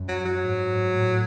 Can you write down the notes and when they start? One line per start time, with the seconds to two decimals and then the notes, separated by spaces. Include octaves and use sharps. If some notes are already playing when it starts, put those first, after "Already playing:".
Already playing: F#2
0.08 F#3
0.25 F#3
0.42 G#2
0.92 A2